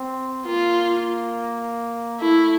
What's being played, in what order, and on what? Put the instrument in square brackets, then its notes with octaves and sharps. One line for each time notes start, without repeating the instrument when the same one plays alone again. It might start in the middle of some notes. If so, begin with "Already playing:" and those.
Already playing: [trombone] C4
[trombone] A#3 [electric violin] F4
[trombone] A3 [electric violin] E4